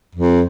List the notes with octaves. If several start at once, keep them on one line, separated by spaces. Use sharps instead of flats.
F2